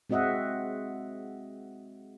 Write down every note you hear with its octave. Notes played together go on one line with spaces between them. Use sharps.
G#3 C4 F#4 D#5 E5 F#5